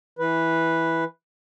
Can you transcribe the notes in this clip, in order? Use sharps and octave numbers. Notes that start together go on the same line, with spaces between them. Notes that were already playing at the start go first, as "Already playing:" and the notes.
E3 B4